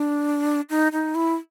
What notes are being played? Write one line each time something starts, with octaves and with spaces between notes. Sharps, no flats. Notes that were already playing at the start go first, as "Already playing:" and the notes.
Already playing: D4
D#4
D#4
E4